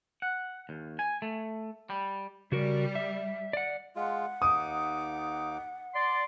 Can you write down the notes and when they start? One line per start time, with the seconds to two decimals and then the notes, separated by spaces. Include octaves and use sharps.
0.22 F#5
0.69 D#2
0.99 G#5
1.22 A3
1.90 G3
2.52 C#3 G3 F#4 A#4
2.95 E5
3.53 D5 F#5
3.96 G#3 F4 F#5
4.42 D#2 D#4 D6 D#6
5.95 D5 C6